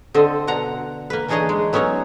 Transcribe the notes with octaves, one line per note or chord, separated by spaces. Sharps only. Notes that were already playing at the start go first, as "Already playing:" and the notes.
D3 C4 A4 D#5
B2 D4 F#5 A#5
A#3 B4
E3 D4 D#4 G#4 C#5 D#5
G#3
F#3 B3 C#4 D#4 C#5